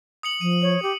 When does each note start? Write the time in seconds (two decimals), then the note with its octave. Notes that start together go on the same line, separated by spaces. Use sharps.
0.23 D#6 C#7 F#7
0.41 F3 D#7
0.62 C#5
0.82 G4